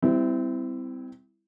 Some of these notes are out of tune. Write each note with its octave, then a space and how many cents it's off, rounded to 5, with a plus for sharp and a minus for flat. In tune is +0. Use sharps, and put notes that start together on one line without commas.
G3 +10 C4 -30 E4 +0